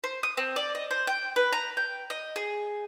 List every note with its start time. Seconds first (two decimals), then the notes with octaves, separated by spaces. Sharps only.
0.04 C5
0.23 D#6
0.37 C4
0.56 D5
0.75 D#5
0.91 C5
1.07 G5
1.36 B4
1.52 A#5
1.77 G5
2.10 D#5
2.36 G#4